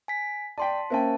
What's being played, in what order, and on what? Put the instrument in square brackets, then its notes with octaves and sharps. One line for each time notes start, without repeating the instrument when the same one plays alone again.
[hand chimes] G#5 B6
[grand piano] D5 G5 [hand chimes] A5 C6 B6
[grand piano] A#3 C#4 G5 [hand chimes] C5 E5 A5